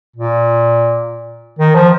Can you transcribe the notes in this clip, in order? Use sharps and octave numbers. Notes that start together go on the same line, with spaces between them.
A#2
D#3
F3